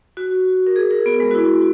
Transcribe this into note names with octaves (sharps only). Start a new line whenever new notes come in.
F#4
A#4
G#4
A#4
B3
G#3
F#4
E4